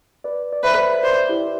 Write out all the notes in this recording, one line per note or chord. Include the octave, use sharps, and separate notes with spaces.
B4 D5
D5
B4 C5 E5
B4 C5 D5
E4 G4